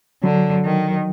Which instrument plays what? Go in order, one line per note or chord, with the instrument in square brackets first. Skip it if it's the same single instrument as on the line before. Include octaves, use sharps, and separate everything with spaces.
[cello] D3 [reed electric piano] F#3
[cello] D#3